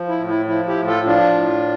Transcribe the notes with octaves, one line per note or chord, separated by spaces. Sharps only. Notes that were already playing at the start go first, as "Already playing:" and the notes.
Already playing: F3
E4
A2
E4
F3 E4
E4 G4
A2
F4 A4
F3 D4 F4
A2